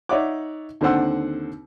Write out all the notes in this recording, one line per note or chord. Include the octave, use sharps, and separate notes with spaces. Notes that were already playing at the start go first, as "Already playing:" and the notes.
D#4 C#5 D5 E5 F#5 D6
D#2 D3 C4 C5 F#5 E6